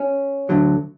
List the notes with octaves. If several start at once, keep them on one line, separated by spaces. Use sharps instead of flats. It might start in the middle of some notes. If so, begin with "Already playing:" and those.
Already playing: C#4
D2 D3 F#3